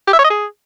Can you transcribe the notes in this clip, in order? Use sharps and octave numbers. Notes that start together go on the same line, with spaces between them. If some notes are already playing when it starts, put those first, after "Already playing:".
G4
E5
C#5
D#5
G#4